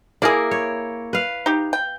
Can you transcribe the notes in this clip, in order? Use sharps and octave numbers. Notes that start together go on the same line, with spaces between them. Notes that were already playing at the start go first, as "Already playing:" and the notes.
A#3 E4 G#4 A#4 D5
C#5
B4 F5
D#4 G4
G5